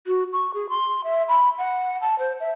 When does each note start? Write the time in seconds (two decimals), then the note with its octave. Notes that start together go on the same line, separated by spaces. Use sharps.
0.07 F#4
0.33 C#6
0.54 G#4
0.69 C6
1.04 E5
1.29 B5
1.58 F#5
2.01 A5
2.19 C5
2.40 E5